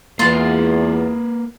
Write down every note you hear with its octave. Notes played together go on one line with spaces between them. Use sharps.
E2 A#3 F4 B4 C6